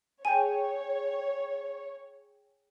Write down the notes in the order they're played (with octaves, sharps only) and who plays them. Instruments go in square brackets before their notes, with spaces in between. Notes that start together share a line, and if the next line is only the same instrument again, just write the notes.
[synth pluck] G#4 G5 [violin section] C#5 [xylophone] G#5 D#7